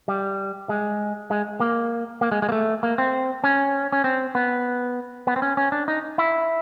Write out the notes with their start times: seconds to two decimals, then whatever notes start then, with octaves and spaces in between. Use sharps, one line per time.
0.08 G3
0.69 G#3
1.31 G#3
1.60 A#3
2.21 A#3
2.32 G#3
2.42 G#3
2.49 A#3
2.52 A3
2.83 A#3
2.98 C4
3.44 C#4
3.92 C#4
4.04 C4
4.35 B3
5.27 B3
5.36 C4
5.42 C#4
5.57 C#4
5.72 D4
5.88 D#4
6.18 E4